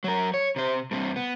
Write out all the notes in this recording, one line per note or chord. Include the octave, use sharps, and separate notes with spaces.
F#3 A#4
C#5
C3 C5
G2 C3
B3